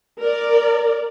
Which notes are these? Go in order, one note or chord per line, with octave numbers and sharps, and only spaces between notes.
A#4 D5